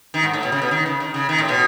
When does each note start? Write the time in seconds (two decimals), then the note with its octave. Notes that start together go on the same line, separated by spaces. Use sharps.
0.14 D#3
0.23 G#2
0.33 A2
0.43 B2
0.52 C#3
0.62 B2
0.71 D#3
0.86 C#3
1.00 D#3
1.14 C#3
1.29 D#3
1.38 A2
1.49 B2